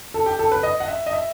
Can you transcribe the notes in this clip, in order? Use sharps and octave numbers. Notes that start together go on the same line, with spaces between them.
A4
G4
A4
B4
D#5
F#5
E5
D#5
E5